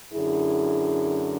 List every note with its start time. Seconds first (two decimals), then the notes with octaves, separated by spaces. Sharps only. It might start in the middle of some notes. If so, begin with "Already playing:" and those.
0.14 F#2 D3 E4 G#4